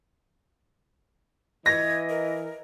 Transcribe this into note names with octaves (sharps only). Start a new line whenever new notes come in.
E3 D#5 G#6 A#6
A#4